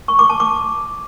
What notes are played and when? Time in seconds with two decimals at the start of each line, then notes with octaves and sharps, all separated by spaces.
0.08 C#6
0.19 D6
0.29 A5
0.40 D6